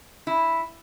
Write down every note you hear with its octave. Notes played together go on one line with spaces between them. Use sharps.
E4